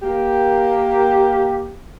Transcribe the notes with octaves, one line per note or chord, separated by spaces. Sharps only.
A#3 G4